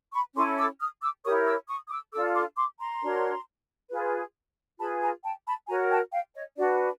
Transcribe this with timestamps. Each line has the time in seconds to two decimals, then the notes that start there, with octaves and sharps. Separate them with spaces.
0.12 B5 C#6
0.34 C#4 E4 A4 C6 D6
0.57 D6 E6
0.79 D#6 F6
1.01 D6 E6
1.24 E4 G4 A#4 C#5 C#6 D#6
1.46 D6 E6
1.68 C#6 D#6
1.87 D#6
1.90 D6 E6
2.13 D4 F4 A4 D6 E6
2.34 C6 D6
2.56 C6 D6
2.79 A#5 C6
3.02 D4 F#4 A#4 C#5
3.90 F4 G#4 B4
4.79 F4 G#4 B4 A5 B5
5.01 G#5 A#5
5.23 G5 A5
5.46 A5 B5
5.68 F#4 A#4 C#5 G#5 A#5
5.90 G5 A5
6.13 F5 G5
6.34 C#5 D#5
6.57 D4 F#4 B4 D5